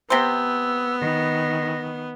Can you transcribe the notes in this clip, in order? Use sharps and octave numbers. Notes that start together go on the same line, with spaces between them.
C3 B3 C5 E6
D#3 A#6